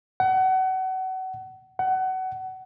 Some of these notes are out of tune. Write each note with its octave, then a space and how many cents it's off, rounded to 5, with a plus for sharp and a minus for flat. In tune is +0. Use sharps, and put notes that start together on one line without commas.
F#5 +30
F#5 +25